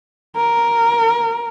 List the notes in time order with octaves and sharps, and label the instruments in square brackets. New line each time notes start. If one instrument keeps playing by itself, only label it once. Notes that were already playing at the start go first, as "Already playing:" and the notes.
[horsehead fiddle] A#4